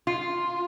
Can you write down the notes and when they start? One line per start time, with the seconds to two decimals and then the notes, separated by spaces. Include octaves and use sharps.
0.07 F4